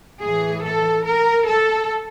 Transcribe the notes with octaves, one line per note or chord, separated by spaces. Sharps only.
A2 E3 G#4
A4
A#4
A4